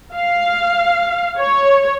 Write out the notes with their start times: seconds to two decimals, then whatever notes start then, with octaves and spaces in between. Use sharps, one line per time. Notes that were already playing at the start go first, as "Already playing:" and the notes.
0.14 F5
1.37 C#5